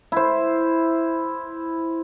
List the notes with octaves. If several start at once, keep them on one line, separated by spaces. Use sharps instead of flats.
E4 C5